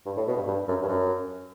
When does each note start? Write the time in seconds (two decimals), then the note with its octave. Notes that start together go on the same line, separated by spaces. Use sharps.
0.06 G2
0.16 A2
0.27 B2
0.37 G2
0.47 G2
0.68 F#2
0.82 G2
0.88 F#2